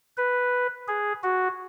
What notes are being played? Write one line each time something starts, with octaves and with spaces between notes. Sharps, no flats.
B4
G#4
F#4